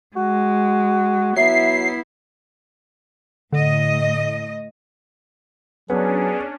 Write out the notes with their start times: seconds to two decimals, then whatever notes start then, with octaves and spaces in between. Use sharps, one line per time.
0.16 G#3 F#4
1.36 F#3 B3 E4 E5 C7
3.52 A2 D3 D#5
5.90 F#3 B3 C#4 D4 G#4